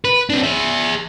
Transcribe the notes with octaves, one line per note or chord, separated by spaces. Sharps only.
B4
C4 D4
G#4 E5